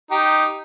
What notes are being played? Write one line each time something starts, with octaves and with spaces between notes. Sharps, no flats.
D#4 G4